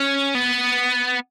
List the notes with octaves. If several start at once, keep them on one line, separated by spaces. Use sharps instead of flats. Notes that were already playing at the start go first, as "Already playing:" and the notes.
Already playing: C#4
B3